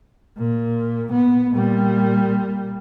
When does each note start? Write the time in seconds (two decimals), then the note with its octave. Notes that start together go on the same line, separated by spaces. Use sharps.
0.38 A#2
1.12 B3
1.52 A#2 G3